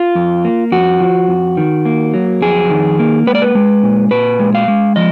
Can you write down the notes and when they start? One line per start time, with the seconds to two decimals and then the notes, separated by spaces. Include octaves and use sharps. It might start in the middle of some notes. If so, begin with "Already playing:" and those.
Already playing: F4
0.15 F2
0.45 A#3
0.72 F2 F#4
1.00 F3
1.28 F2
1.57 D#3
1.85 A#3
2.14 F#3
2.42 F2 G#4
2.70 D#3
2.99 A#3
3.27 G#3 B4
3.35 D5
3.42 B4
3.55 G#3
3.83 A#2
4.11 A#2 B4
4.40 G#3
4.55 F5
4.68 G#3
4.96 F3 D#5